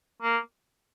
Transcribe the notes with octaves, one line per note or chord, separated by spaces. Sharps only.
A#3